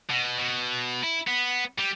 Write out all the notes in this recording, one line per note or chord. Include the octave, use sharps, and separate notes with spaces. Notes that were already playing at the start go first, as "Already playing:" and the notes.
B2
B2
E4
B3
G3